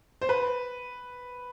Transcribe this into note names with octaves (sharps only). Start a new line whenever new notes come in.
C5
B4